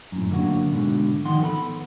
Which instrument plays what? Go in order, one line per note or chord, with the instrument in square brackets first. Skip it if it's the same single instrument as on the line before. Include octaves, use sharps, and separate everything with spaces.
[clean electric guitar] F#2 A2
D3 F#3 A#3 F#4
G#2 B2 D3
D#3 F3 D#4 F#5 C6
B3 A4 A5 B5